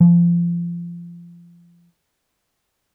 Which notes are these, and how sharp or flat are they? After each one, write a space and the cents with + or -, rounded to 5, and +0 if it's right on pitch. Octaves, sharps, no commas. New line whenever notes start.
F3 -25